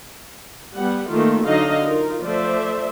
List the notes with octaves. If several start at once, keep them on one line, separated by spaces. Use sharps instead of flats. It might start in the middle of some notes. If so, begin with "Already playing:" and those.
G3 B3 F#5
D#3 A3 A#3 F4
D3 F#3 D#4 D#5 F5
D#4 F4 A#4
F3 A3 C5 D5 E5